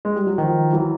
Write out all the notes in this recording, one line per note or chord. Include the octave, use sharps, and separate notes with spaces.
G#3
G3
F#3
D#3 F3
E3 F#3